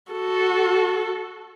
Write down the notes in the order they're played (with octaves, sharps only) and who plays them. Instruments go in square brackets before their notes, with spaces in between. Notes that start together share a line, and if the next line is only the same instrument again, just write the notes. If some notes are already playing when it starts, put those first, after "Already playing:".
[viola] F#4 A4